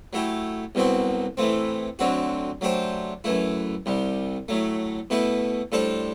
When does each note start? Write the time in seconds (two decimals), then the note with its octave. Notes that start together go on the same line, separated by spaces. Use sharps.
0.13 F#3 A3 E4 G4
0.75 C2 B2 F#3 C4 F#4
1.37 A2 E3 A3 C4
1.99 D2 D3 F#3 C4 F#4
2.61 F#3 A3 D4 G4 C5
3.24 F#2 E3 A3 E4
3.86 C2 C3 G3
4.48 A2 F#3 A3
5.10 B2 A3 E4 B4
5.72 A2 G3 D4 A4 C5